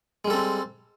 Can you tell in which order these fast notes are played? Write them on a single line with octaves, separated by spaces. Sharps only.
G#3 G3 A4 C4